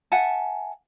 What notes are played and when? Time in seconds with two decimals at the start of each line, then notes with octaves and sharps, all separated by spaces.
0.12 E5 F#5 G#5 A5